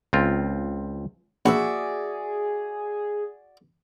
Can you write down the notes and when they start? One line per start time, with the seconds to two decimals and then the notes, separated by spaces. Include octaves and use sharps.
0.13 C#2 C4 F4
1.46 A#1 F#4 G#4 D5 E5